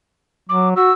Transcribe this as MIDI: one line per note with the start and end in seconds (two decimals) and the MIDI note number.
0.49 0.74 54
0.49 0.69 86
0.76 0.92 66
0.76 0.93 88